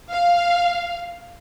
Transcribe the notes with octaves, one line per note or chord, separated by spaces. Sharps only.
F5